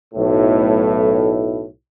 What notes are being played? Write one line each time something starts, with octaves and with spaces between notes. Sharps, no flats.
B1 A2